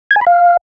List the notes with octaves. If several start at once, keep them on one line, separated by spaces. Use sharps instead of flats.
G#6
G#5
B5
F5